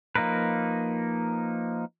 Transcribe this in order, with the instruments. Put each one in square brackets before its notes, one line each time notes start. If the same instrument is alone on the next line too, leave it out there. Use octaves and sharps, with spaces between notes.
[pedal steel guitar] F3 A#3 D#4 A#4 B4